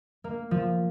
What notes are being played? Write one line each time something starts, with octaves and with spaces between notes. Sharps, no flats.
A#3
F3